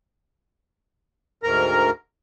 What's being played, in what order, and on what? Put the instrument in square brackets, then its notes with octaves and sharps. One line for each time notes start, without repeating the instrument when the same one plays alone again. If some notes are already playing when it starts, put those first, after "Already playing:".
[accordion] D2 G#2 A#4 A#5